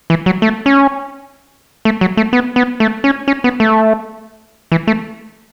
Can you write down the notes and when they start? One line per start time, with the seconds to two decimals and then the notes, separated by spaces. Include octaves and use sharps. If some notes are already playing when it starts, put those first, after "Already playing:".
0.10 E3
0.26 F#3
0.42 A3
0.66 C#4
1.85 A3
2.01 F#3
2.17 A3
2.33 B3
2.56 B3
2.80 A3
3.04 C#4
3.28 C#4
3.44 B3
3.60 A3
4.72 E3
4.87 A3